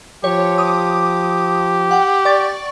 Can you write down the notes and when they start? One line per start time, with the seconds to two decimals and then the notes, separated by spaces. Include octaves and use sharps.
0.24 F3 G4 C#5
0.58 D6 D#6
1.91 F#5 G5
2.25 D5 C#6 A6